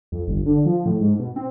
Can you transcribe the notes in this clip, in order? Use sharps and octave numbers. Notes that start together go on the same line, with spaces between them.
F2
G1
D3
F3
A2
G#2
B2
C4